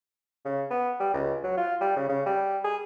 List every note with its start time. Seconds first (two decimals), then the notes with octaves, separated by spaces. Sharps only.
0.45 C#3
0.70 B3
1.00 G3
1.14 C#2
1.43 F#3
1.57 F4
1.81 G3
1.96 C#3
2.09 C#3
2.26 G3
2.64 G#4